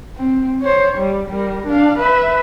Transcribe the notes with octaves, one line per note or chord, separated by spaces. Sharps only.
C4
C5 C#5
G3
G3 A#4
D4 F5
B4 E5